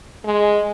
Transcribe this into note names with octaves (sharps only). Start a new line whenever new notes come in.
G#3